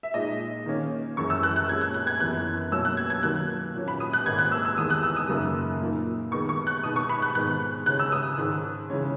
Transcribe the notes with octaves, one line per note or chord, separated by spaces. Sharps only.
E5
A#2 G#3 D#4 D#5
D#3 A#3 C#4
F#2 E3 G#3 C#6
E6
F#6
F#6
A#2 G#3 C#4 G#6
F#6
F#6
G#6
F#2 E3 B3 F#6
B2 F#3 A#3 C#4 E6
F#6
G#6
G#6
D#3 F#3 A#3 F#6
A#2 A#3 C#4
B5
D#6
F#6
G#2 D#3 A#3 G#6
F#6
E6
E6
E2 D#3 G#3 D#6
F#6
E6
D#6
F#2 C#3 F#3 A#3 D#4
A#2 A#3 D#4
D#3 G#3 B3 D#4 C#6
C#6
F#6
B2 G#3 B3 D#4 D#6
C#6
B5
F#6
G#2 D#3 G#3 B3 F#6
C#3 G#3 C#4 F#6
E6
D#6
G#2 D#3 G#3
C#3 E3 G#3 C#4